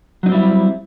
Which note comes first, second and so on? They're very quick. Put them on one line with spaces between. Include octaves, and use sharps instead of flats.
F#3 D#4 C4 G3 E4